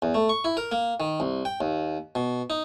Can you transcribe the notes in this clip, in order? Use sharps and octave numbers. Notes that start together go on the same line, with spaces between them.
E2
A3
C#6
E4
A#4
A#3
D#3
C2
G5
D#2
B2
D#4